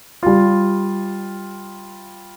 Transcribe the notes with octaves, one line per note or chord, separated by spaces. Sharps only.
G3 F4